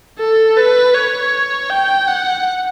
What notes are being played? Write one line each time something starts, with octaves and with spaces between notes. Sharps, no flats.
A4
B4
C#5
G5
F#5